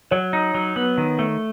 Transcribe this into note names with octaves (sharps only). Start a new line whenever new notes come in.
F#3 C#5
D#4
F#3
B3
D#3
A3